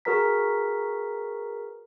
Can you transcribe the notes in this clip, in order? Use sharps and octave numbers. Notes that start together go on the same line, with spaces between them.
F#4 G#4 A#4 B4 A#5 B6